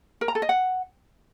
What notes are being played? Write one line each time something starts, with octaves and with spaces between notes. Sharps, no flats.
A#4
A#5
A4
D#5
F#5